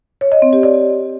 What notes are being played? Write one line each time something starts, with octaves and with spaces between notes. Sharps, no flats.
C#5
D#5
C4
G4
D5